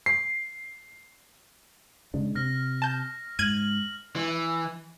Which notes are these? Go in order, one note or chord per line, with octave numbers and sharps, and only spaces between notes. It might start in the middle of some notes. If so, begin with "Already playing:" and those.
C7
C#3 G#3 D4
C3 F6 A#6
A5 G6
G#2 F6 G#6 D#7 F#7
E3